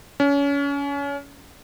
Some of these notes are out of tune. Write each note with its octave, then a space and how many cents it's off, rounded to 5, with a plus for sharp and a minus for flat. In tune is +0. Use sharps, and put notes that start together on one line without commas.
C#4 +30